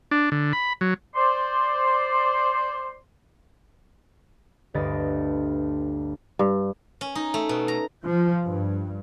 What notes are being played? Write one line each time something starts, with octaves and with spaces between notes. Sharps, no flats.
D4
D3
B5
F#3
C5 D5 C6
G1 D2 B4 D#5 A6 D7
G2
C#4
D#4
A3
B2
A#5
F3
G2